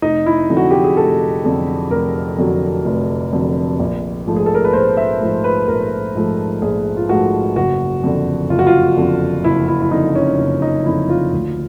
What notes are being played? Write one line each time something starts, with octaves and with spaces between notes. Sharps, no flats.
F1 D#4
E4
F2 D3 F#3
F#4
G4
G#4
F1 A4
F2 D3 F#3
F1 A#4
F2 D3 F#3
F1
F2 D3 F#3
A#1
G#2 F3 A3
G#4
A4
A#4
B4
A#1 C5
E5
G#2 F3 A3
B4
A#1 A#4
G#2 F3 A3
A#1 G#4
F4
G#2 F3 A3 F#4
F#1 F#4
F2 D3
F#1 F4
F#4
F4
F2 D3
F#1 E4
E4
E4
F2 D3 D#4
C#4
F#1
D#4
F2 D3 E4
F4
D2